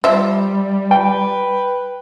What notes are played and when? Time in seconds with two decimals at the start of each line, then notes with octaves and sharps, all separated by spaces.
0.04 F3 G3 E5
0.91 B4 G5